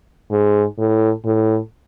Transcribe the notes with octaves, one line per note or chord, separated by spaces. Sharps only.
G#2
A2
A2